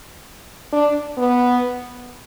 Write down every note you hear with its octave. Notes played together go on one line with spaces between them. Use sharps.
D4
B3